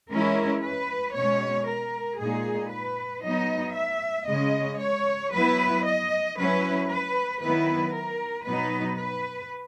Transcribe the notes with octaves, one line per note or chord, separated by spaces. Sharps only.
E3 G#3 C#4 E4 A#4
B4
B2 G#3 C#4 C#5
A#4
A#2 G#3 D#4 G#4
B4
F#3 B3 D#4 D#5
E5
C#3 G#3 C#4 D#5
C#5
F#3 B3 E4 B4
D#5
F#3 C#4 E4 B4
B4
D#3 F#3 B3 E4 B4
A#4
B2 F#3 B3 D#4 B4
B4